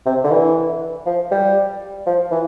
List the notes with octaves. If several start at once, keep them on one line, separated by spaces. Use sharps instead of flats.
C3
D3
E3
F3
G3
F3
E3